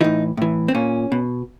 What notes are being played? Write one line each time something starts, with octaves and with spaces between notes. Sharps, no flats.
A2 E3 D#4
A2 E3
C4
A#2 C#4
B2